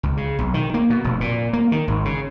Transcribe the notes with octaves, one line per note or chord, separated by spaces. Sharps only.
C#2
C#3
B1
D#3
A#3
B2
F1
A#2
A#3
D#3
G#1
C#3